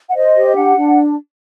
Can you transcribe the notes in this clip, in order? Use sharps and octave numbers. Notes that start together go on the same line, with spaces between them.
F#5
C5 D#5
G4
D4 F#5
D4